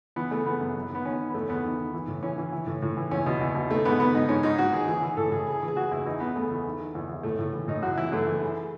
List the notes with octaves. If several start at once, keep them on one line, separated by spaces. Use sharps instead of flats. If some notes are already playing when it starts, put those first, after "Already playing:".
E3 B3
C#3 A3
E3 B3
F#2
F#2
D#3 B3
D#3 C#4
D#3
B3
E2 A3
E2 B3
D#3
D#3
E3
A2
E3 C#4
E3
E3
A2
A2
E3
E2 C#4
B2
E2
B2
D#3 A3
G#2 B3
D#3 B3
G#2 D#4
G#2 C#4
G#2 D#4
G#2 F#4
D#3 G#4
E3 G#4
E3
A2 A4
A2 G#4
C#3 G#4
E3
G#4
E3 F#4
E2 E4
E3 D#4
C#3 B3
C#3 A3
E2
D#3
D#3
E2
E2
A2 A3
A2
E3
A2 D#4
F#2 F#4
E3 E4
F#2 A3
E3
C#3